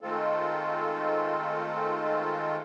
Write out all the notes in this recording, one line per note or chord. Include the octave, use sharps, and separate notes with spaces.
D#3 G#3 A3 C4 F4 A4